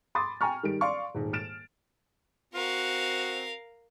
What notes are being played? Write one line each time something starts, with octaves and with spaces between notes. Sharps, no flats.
B5 C6 D6 D#6 A6
G5 G#5 A#5 C#6 F6
D#3 G3 D7
D5 F5 C6 C#6
D#1 G#2
F6 A6 D7 E7
C4 F#4 A#4 F5